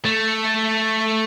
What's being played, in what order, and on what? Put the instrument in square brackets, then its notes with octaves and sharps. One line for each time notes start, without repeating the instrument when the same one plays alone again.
[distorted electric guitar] A3